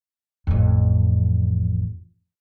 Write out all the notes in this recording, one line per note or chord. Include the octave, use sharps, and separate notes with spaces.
A1 F2